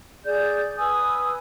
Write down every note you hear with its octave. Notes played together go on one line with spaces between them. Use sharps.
G#4 D5 G6
B4 G#5 D#6 E6